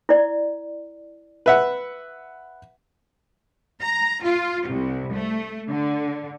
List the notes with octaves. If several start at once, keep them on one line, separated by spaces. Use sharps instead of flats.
E4 D5
B4 E5 F#5
A#5
F4
C2
A3
D3